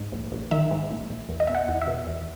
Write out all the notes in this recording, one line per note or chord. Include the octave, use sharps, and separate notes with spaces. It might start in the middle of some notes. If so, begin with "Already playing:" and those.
Already playing: G#2
A#1
A#1
D#3 E5
G#2
A#1
A#1
E2
D#5
B2 E5
F#5
E2
E5
B2
E2